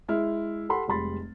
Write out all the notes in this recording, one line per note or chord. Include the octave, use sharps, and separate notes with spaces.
G#3 E4 F6
G4 A4 F#5 B5 C6
F1 G3 G#3 B5 C6 A6